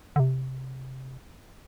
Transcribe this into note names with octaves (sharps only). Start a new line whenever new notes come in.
D3
C3